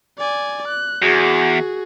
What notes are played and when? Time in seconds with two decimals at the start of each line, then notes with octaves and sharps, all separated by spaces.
0.18 D5 G#5
0.68 F#6
1.02 E2 F#4 G#4